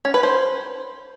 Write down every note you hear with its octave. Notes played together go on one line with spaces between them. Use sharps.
C#4
B4
C5